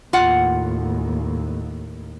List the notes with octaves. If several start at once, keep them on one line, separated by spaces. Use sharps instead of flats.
D#2 A2 F4 F#5